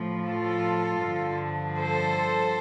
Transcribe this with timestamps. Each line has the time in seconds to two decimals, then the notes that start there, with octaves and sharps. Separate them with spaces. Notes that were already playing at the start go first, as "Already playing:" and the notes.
Already playing: A2 F3
0.27 F4 A4
1.02 G2 D3 F3
1.77 A4 C5